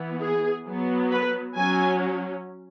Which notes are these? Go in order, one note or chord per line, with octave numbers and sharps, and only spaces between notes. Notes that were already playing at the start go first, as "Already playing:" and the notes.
Already playing: E3 B3
G#4
F#3 B3
B4
F#3 C#4 G#5